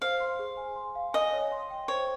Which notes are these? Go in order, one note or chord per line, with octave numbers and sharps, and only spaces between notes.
C5 F5
C6
G#4
G#5
C6
F5
D#5 G#5
C#5
C6
G5
C5 C#5